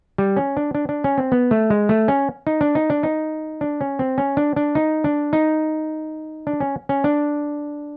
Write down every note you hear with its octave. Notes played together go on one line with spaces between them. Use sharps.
G3
C#4
D4
D4
D4
C#4
C4
B3
A3
G#3
A3
C#4
D#4
D4
D#4
D4
D#4
D4
C#4
C4
C#4
D4
D4
D#4
D4
D#4
D4
C#4
C#4
D4